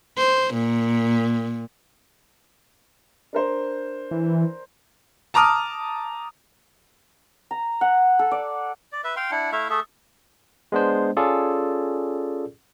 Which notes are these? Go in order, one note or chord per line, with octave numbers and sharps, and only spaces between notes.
C5
A#2
D4 A#4 C5
E3
A5 A#5 D6 D#6 F6
A#5
F#5
A4
D5
D5
B4 E5
F5 G5 C6
D4 E4 F#5
A3 E4 E5 F5
A3 G#4 A4 E5
G#3 B3 D4 C5
C#4 F4 G#4 A4 D5